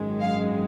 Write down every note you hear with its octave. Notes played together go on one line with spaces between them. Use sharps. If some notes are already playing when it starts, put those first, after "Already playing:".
Already playing: G#1 F#2 D#3 G#3
F5